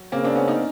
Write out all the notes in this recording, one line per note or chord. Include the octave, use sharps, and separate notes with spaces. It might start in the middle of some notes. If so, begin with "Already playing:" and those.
Already playing: F#3
C#3 A#3 C4
C4 D4
B3 C#4
C#4 D#4